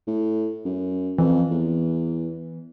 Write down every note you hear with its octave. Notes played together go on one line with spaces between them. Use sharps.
A2
F#2
F2 E3
E2